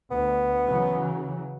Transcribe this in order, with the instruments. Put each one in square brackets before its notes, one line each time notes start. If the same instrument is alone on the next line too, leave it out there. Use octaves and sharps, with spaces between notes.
[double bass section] D2 [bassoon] B3
[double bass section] C#3 E3 F#3